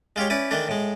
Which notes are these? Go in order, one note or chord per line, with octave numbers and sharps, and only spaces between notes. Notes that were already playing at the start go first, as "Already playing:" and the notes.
G#3 F4 G4 C#5
C#4 E4 B4 D5
D#3 E3 A3 D4
A2 G#3